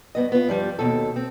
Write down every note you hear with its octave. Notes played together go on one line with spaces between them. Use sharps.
G2 B3 D#5
B3 F4
G2 F3 G3
D#2 B2 A4
C4